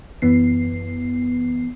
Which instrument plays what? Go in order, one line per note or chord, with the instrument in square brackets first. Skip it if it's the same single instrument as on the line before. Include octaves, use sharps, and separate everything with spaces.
[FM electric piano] F#2 E3 B3 C7